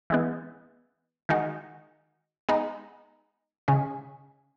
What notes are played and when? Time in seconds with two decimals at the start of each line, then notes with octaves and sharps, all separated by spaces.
0.10 E3 G#3 B3
1.29 D#3 G#3 D#4 F#4
2.49 G#3 B3 D#4
3.68 C#3 G#3 C#4